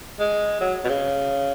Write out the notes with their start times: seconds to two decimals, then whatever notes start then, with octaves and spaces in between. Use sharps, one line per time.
0.20 G#3
0.61 F#3
0.84 B2
0.89 C#3